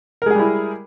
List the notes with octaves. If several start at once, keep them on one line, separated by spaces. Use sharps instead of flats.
G3 G#3 E4 G#4 A#4